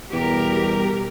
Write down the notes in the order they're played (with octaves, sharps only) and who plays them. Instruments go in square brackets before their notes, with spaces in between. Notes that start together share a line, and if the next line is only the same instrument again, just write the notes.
[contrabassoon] E2 [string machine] B2 G3 [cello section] G4 A#4